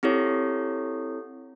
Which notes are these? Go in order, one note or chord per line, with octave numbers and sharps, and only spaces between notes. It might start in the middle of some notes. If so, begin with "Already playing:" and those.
C4 E4 G4 A4 C#5